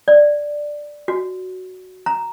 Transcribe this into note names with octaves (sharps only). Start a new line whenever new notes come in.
D5
F#4
A#5